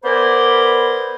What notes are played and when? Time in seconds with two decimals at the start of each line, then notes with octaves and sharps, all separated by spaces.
0.04 B3 A#4 C5 D5 G#5 B5